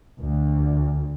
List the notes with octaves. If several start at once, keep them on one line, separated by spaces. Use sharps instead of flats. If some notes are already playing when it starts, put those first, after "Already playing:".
D2